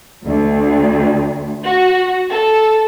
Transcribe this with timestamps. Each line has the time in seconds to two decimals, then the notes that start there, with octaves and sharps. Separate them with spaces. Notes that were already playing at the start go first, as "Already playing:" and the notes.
0.25 D2
1.63 F#4
2.31 A4